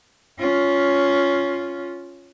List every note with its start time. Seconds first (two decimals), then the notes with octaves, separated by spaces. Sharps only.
0.39 C#4 F4